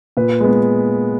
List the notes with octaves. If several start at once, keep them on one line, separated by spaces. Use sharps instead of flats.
A#2 B4
G#3 B3